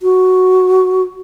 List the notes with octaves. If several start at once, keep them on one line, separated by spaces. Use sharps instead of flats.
F#4